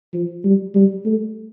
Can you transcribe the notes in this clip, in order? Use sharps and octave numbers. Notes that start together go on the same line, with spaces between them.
F3
G3
G3
A3